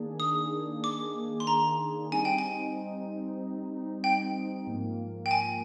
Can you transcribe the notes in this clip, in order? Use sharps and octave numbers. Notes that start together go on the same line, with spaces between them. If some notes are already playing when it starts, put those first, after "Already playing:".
Already playing: D#3 A#3 D4 G#4
D#6
D6
C6
A#5
G3 C4 D#4 G#5
G5
G#5
G5
G#2 F3 A#3
G5
G#5